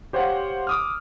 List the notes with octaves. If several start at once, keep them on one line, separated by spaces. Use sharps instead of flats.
G4 C5 C#5 F5 F#5
D6 D#6 F6